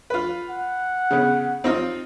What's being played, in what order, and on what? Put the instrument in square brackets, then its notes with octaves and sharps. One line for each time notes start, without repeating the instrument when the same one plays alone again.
[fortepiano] F4 B4
[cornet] F#5
[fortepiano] C#3 B3
C4 D#4 F4